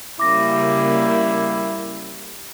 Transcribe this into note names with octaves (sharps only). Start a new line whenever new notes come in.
C#3 G3 A#3 E4 D6 A#6